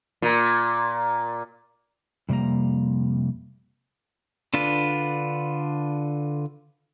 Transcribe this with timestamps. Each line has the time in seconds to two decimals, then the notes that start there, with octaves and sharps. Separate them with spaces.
0.22 A#2
2.29 F2 C3 G3 A#3 A#5
4.54 D3 D4 F4 B4